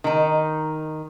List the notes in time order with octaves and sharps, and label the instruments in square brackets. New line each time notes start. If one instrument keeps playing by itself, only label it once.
[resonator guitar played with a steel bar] D#3 D#4